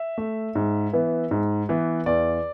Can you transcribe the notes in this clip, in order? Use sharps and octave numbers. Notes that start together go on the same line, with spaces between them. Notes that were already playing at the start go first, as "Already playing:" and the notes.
Already playing: E5
A3
G#2
E3 B3
G#2
E3 B3
E2 D5